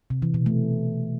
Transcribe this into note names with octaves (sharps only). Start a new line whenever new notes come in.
C3
E3
B2
A3